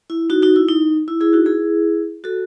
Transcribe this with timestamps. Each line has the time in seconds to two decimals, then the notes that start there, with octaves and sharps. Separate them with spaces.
0.10 E4
0.30 D#4 F#4
0.42 D#4 F#4
0.56 E4
0.68 D#4
1.08 E4
1.21 E4 G#4
1.33 D#4 F#4
1.46 E4 G#4
2.24 F#4 A4